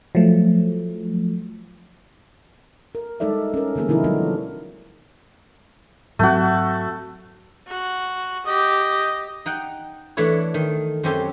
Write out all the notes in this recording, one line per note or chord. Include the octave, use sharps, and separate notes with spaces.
F3 F#3 A3
A#4
G3 G#3 D#4 A4 D5 E5
C#4 A#4
D3 E3 G3 A#3 B3 G#4
B2 D3 F3 D#4 E4 A#4
F#3 G#3 B3 D4 F4 F#4
G#2 F#3 A3 C4 F#4
F#4
G4 D#5
D#4 F#5 G5
E3 A3 D4 E4 C#5
D#3
F#2 C4 C#4 G4 A4 C6